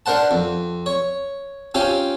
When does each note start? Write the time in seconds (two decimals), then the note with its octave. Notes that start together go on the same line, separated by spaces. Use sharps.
0.06 D4 A#4 C5 F#5 A5
0.31 F2
0.86 C#5
1.75 C4 C#4 F4 G4 G#5